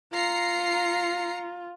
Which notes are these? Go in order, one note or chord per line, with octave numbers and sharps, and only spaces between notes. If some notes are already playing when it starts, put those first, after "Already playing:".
F4 A#5 C7 C#7